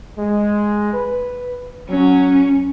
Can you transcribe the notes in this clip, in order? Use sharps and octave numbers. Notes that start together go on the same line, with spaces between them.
G#3
B4
F#3 C#4